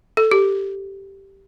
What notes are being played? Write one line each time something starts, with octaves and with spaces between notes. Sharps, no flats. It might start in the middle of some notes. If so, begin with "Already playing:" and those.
A4
G4